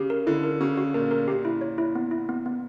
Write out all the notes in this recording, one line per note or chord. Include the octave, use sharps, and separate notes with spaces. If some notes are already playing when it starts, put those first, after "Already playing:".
Already playing: C#3 G4
A#4
D3 E4
A#4
C#3 F#4
F#4
A#2 A#4
A#4
A#2 G4
E4
C#5
E4
B3
E4
B3
B3